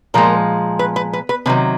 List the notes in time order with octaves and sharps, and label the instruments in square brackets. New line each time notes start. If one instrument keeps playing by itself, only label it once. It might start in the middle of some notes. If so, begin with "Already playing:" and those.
[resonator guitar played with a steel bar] A#2 F3 G#3 A#4
B4
B4
B4
B4
C3 D#3 F#3 B4